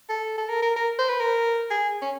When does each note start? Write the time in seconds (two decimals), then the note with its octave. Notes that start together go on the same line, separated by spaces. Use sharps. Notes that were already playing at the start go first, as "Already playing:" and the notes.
0.09 A4
0.38 A4
0.49 A#4
0.62 A#4
0.76 A#4
0.99 C5
1.09 B4
1.20 A#4
1.70 G#4
2.02 C#4